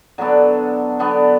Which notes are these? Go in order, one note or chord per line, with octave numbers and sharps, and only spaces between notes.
D3 F#3 B3 D4
D3 F#3 B3 D4